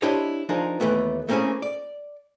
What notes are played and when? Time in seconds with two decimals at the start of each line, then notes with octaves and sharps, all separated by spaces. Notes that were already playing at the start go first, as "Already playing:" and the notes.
0.02 D4 E4 G4 C5 C#5 D#5
0.49 F3 D4 D#4 G#4 A#4
0.80 D#2 G#2 E3 A3 B3
1.29 A3 A#3 C4 C#4 E4 G#4
1.62 D5